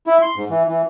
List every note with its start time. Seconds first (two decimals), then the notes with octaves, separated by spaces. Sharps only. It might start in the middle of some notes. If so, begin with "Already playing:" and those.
0.07 E4
0.22 C6
0.36 G#2
0.50 E3
0.68 E3